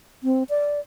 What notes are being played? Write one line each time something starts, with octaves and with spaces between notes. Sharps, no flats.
C4
D5